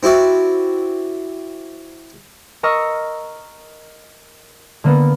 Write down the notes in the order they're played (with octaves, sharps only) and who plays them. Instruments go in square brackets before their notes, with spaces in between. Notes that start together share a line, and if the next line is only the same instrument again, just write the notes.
[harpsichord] C4 E4 F#4 D5
[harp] A#4 D#5 A#5 C#6 E6 F6
D3 A#3 B3